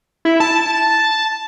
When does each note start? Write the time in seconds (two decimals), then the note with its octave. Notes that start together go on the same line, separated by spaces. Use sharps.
0.25 E4
0.40 A5